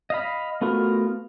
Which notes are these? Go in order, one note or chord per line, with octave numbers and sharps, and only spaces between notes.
D#5 F5 B5
A3 B3 F4 F#4 A#4